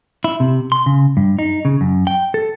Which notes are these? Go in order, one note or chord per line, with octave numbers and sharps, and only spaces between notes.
E4
C3
C6
C#3
G2
D#4
C#3
F#2
G5
A4